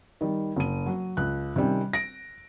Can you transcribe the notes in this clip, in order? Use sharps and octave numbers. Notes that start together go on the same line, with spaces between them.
D#3 G3
F#1 D#7
F#3
C#2 F#6
C3 D#3 G3 C#4
A#6 D7